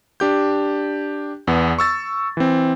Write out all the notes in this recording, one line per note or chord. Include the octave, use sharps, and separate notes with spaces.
D4 G4 G6
E2 B3
C#6 E6 A6
E3 C4